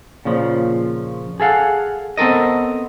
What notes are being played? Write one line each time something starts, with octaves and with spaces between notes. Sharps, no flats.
A#2 C#3 F3
G#4 A4 F5 F#5
B3 C4 A4 A#4 D#5